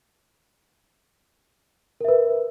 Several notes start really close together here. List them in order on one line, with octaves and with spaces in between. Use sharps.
A#4 E5 B4